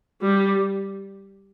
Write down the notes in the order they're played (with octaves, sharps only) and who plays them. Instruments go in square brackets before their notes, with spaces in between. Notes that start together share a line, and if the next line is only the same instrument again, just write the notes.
[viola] G3